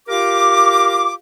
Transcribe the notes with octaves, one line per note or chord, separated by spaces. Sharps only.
F4 G4 A#4 F5 D6